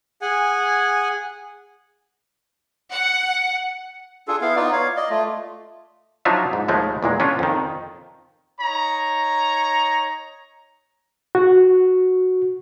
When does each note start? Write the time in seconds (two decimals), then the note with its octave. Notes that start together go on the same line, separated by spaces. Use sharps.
0.22 G#4 F#5 G#5
2.91 F#5
4.28 D4 F4 G#4 A4
4.41 B3 E4 F5
4.56 B3 D#4 F4 D5
4.72 C#5 F5
4.96 D5 D#5
5.10 A3 F4
6.25 F3 F#3 D4 D#4 F4 E5
6.53 G#2
6.68 D#2 F3 G#3 A3
7.03 E2 A#2 G#3
7.20 C#4 D4 F4
7.39 F2 D#3
8.61 D#4 C#5 A#5
11.35 F#4